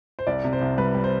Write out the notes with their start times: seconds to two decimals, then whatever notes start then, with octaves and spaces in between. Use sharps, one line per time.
0.19 C5
0.27 C2 D5
0.44 C3
0.53 C5
0.61 C2
0.78 G3 B4
0.94 G3
1.04 C5